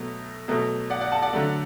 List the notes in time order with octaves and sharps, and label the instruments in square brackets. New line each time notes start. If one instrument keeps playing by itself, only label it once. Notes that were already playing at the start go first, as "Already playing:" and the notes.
Already playing: [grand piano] B2 F#3 A3
B2 F#3 A3
D5 F#5
D5 F#5
F#5 A5
D5 F#5
D3 F#3 A3